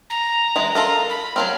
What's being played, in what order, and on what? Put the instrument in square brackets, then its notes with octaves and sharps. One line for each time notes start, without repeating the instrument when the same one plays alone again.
[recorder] A#5
[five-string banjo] E3 G#3
F4 A4 A#4
[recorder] B5
[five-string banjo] F#3 A#3 C4 [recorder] F6